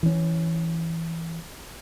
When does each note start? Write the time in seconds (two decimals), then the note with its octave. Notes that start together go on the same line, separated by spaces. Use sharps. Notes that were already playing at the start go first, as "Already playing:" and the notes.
0.03 E3 C#4